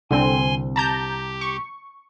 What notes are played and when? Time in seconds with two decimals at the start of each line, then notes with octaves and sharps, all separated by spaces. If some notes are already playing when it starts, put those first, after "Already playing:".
0.11 C2 D3 C4 G#5 C6
0.76 G4 A5 A#5 G6
1.41 C#6